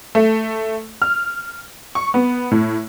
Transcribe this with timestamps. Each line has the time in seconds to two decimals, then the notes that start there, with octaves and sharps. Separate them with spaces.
0.15 A3
1.02 F6
1.95 C#6
2.14 B3
2.51 A2